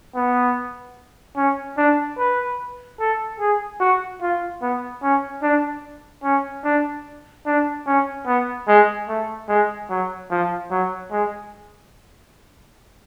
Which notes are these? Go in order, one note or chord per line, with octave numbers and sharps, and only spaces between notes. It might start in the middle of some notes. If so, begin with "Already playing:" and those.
B3
C#4
D4
B4
A4
G#4
F#4
F4
B3
C#4
D4
C#4
D4
D4
C#4
B3
G#3
A3
G#3
F#3
F3
F#3
G#3